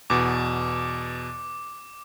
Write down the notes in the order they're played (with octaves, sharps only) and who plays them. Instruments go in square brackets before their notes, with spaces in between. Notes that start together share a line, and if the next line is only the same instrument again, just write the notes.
[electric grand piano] E2 B2 [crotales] D6